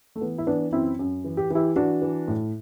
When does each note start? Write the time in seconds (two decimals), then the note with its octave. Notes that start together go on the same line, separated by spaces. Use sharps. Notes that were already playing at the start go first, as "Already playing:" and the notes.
0.16 A3
0.21 E3 B3
0.38 E4
0.47 E3 B3 D4
0.73 F#2 C4 E4
0.99 F#2
1.24 E3
1.37 G4
1.50 E3 E4 G4
1.76 E3 D4 F#4
2.02 E3
2.28 A2